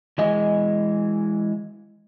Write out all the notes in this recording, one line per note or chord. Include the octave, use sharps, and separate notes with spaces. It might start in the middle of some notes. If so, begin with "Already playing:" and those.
E3 G#3 D#5 G#5